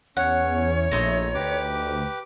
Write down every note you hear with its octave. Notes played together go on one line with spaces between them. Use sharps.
E2 C#4 C#5 F#5
A#1 A3 D#4 E4 C5 A#5
D2 G4 B4 D6